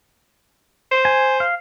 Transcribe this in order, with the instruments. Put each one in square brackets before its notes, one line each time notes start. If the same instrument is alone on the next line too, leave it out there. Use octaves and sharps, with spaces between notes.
[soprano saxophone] C5
[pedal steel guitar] G#5
F5